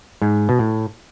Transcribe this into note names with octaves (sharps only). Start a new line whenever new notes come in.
G#2
B2
A2